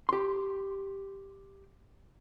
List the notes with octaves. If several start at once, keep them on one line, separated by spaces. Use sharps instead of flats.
G4 C6